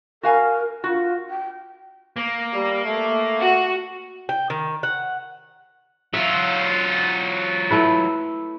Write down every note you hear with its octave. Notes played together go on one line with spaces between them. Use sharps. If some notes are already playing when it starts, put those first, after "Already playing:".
F#4 A#4 F5 G#5
F4 F#4
G5
A#3
G3
A3
F#4
G5
D#3
F#5
F#3 F4 E5
A3 E4 B4